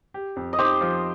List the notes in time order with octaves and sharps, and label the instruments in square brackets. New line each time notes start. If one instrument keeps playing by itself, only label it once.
[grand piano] G4
F2
[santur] D#5
[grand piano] D#4 [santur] G4 C5
[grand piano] F3